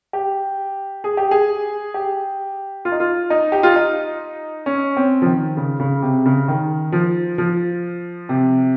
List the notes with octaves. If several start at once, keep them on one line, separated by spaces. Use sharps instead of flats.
G4
G#4
G4
G#4
G4
F4
D#4
F4
D#4
G4
F4
D#4
C#4
C4
F3
D#3
C#3
C#3
C3
C#3
D#3
F3
F3
C3